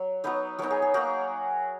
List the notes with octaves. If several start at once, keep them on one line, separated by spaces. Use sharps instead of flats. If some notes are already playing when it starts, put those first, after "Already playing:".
Already playing: F#3
F#3 B3 D#4 B4 D#5
F#3 B3 D#4 A#4 C#5
G#4
G#4
A#3 D#4 F#4 A#4